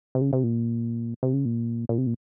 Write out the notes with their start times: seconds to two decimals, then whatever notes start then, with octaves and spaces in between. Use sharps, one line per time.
0.15 C3
0.21 C#3
0.33 C3
0.43 A#2
1.23 C3
1.33 C#3
1.45 A#2
1.89 A#2
1.98 C3
2.07 A#2